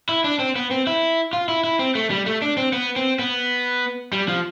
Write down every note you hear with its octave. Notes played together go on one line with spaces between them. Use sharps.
E4
D4
C4
B3
C4
E4
F4
E4
E4
C4
A3
G3
A3
D4
C4
B3
C4
B3
G3
F3